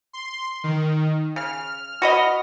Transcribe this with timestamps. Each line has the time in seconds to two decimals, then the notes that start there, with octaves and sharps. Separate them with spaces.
0.13 C6
0.64 D#3
1.36 C#3 F6
2.02 F#4 B4 D#5